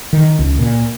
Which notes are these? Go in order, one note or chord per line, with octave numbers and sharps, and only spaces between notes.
D#3
C#2
A#2